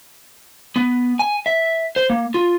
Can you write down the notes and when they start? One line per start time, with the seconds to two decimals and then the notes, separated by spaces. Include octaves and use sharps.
0.76 B3
1.19 G#5
1.46 E5
1.96 C5
2.10 A#3
2.34 F4